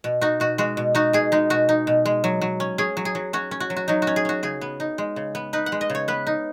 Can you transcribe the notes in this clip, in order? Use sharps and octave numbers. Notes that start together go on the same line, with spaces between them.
B2
D#4 F#4
B2 F#4
G#3 F#4
B2
D#4 F#4
B2 G#4
G#3 D#4
B2 F#4
D#4
B2
G#3
F#3
F#3
C#4
C#4 G#4
F#3
G#4
F#3
C#4 F#4
C#4
F#4
F#3
F#4
F#3 D#4
F#4
C#4
G#4
C#4 F#4
C#3 G#4
B3
D#4
G#3
C#3
B3
D#4 B4
F#5
G#3
D#5
C#3
C#5
B3 B4
D#4